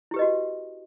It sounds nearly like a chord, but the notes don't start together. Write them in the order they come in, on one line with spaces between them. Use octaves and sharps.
E4 G4 B4 D#5 F#4